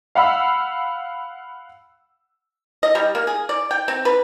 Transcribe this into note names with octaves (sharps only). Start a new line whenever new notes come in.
F5 F#5 B5 E6
D#5
G3
A#3
G#4
D5
G5
C4
B4